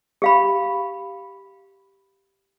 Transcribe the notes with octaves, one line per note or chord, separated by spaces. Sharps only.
G4 F5 B5